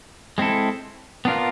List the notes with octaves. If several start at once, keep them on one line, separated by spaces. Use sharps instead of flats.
G#3 C4 E4 A4
B3 D4 F4 A#4